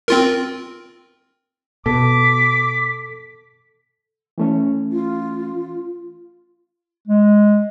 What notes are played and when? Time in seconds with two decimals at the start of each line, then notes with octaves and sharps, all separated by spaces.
0.08 C4 F4 A#4
1.86 B2 A4 D6 B6
4.38 E3 A3 C#4
4.92 F4
7.08 G#3